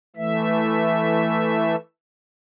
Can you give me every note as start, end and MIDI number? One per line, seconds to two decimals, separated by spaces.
0.16 1.76 52
0.16 1.76 57
0.16 1.76 76